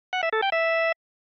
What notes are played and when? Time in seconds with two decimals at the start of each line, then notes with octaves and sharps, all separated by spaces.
0.13 F#5
0.23 E5
0.33 A4
0.42 G5
0.52 E5